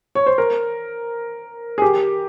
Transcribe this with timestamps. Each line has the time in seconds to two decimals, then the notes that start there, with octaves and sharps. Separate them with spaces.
0.15 C#5
0.26 C5
0.38 A#4
1.78 G#4
1.82 G4